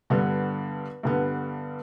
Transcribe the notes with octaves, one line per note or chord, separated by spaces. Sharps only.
G2 D3 G3 B3
G2 D3 G3 B3